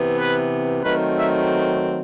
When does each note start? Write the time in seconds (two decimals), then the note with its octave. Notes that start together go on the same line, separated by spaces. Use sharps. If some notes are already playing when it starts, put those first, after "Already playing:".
Already playing: C3 E3 B3
0.17 B4
0.83 D#3 F#3 A3 C4 B4
1.17 E5